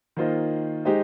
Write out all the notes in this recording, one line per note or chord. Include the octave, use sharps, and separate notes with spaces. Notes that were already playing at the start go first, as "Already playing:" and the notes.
D#3 A#3 F4 C5 D#5
G#3 D#4 G4 C5 D#5